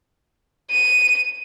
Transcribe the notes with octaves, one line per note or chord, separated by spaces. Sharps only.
D#7